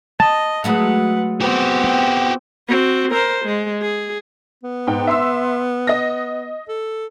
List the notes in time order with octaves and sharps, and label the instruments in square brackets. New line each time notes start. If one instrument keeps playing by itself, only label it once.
[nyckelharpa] D#5 [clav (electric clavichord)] A5
[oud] F#3 G#3 A3 [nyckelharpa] B4 F#5
[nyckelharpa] B3 C4 [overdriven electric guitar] F#4 G4
[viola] C4 F#4
A#4 C5
G#3
G#4
[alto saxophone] B3
[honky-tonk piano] G#2 G5
E5 C6 E6
D#5 A#6
[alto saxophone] A4